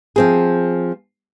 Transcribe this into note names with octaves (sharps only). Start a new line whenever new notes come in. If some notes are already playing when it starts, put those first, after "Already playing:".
F3 C4 G#4